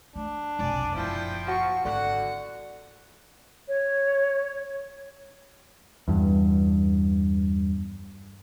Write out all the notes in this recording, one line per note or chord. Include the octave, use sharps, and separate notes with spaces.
A3 D4
F1 B1 D5 G#5
F#1 A#2 F3 E4 G5
F#4 C#6
G#1 D3 F#4 F#5
C#5
E2 G2